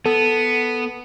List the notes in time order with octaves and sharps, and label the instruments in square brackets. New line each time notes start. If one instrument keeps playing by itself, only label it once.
[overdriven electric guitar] B3 [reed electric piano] A4